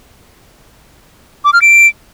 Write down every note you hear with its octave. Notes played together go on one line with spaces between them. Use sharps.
D6
F6
D7